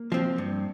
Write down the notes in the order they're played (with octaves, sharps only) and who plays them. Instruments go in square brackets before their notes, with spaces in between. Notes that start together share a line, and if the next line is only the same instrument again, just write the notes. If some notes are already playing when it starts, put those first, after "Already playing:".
Already playing: [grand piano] A#3
[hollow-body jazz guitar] F3 C4
G2